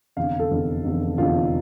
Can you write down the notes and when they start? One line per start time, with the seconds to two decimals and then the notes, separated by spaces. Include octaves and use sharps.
0.16 F1 E2 D3 F5
0.39 A4
0.51 F1 E2 D3
0.84 F1 E2 D3
1.18 F1 E2 D3 F4